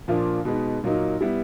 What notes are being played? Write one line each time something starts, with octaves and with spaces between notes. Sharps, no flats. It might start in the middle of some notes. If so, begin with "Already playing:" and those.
A#2 F3 A#3 D4 F4
B2 G#3 B3 D#4
A#2 F#3 A#3 D#4
G3 B3 E4